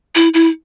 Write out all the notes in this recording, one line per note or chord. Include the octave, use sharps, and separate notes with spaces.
E4
E4